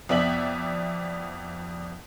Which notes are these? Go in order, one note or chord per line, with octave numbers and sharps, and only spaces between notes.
F2 B3 D5 E5 F#7